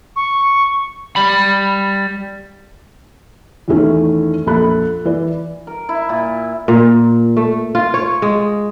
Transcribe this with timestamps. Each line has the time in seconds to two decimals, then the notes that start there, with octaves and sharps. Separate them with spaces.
0.16 C#6
1.16 G3 B5
3.68 E2 D#3 E3 A3 C#4
4.47 A#1 F2 A4 B5 F#6
5.05 E3 B4 D5
5.67 A#4
5.89 E4
6.09 A#2
6.68 A#2
7.37 A3
7.75 F4
7.94 C#5
8.22 G#3